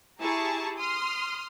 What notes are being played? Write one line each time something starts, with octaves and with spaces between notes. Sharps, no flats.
E4 G4 G#4 A5 A#5 C#6
C6 D#6 F6